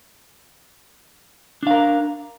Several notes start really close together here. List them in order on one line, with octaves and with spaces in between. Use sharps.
D4 F5 A#4